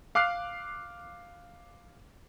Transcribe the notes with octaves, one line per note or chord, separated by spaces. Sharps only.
F5 D6 F6 F#6 C7